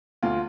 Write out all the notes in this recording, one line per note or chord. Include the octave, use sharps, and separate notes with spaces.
D2 F4